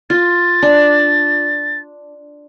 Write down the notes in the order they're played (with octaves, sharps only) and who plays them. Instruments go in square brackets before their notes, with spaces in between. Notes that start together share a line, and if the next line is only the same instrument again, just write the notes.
[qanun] F4 [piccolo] A6
[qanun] D4